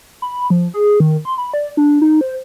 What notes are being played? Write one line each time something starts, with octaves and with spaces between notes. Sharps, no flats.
B5
F3
G#4
D#3
C6
B5
D5
D4
D#4
C5